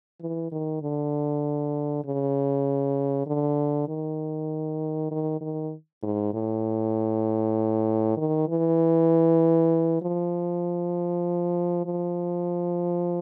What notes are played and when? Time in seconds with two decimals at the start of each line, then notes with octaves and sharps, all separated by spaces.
0.21 E3
0.52 D#3
0.82 D3
2.05 C#3
3.27 D3
3.88 D#3
5.11 D#3
5.41 D#3
6.03 G#2
6.34 A2
8.17 D#3
8.48 E3
10.02 F3
11.86 F3